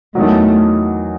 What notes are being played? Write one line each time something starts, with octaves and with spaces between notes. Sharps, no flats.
E2 D#3 F#3 A3